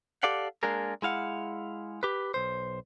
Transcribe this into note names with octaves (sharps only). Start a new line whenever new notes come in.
G4 A4 D5 F5 F#5
G#3 A#3 D4 G#4 A#4
G#3 E4 F5 F#5
G4 B4
B1 C5